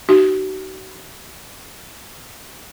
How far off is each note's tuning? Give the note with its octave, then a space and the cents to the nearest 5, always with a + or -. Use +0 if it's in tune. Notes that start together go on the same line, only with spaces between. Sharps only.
D#4 -25 F#4 +40